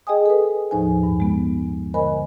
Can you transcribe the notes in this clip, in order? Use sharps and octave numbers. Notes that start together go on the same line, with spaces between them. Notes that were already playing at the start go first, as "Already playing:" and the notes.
G#4 D#5 G5 G#5 D#6
A4 B4
D#2 A2 F3 D#4 C5 G#5
G2
G#3 B3
D3 A#4 C5 D#5 G#5 B5